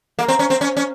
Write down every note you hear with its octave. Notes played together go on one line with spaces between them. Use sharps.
A#3
C4
C#4
C4
C#4
C#4